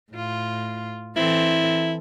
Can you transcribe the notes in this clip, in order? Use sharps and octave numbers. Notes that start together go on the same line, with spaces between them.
A2 F4
E3 C4 E4 A4